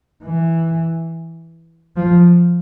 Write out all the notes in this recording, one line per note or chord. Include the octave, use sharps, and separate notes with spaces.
E3
F3